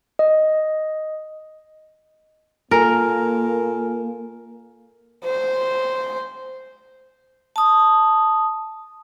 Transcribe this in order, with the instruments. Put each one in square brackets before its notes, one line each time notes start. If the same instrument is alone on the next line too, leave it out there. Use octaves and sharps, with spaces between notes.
[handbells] D#5
[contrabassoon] A#2 [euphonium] A#3 [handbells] A4 G#5 F6 [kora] A#4
[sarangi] C5
[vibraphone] A5 D#6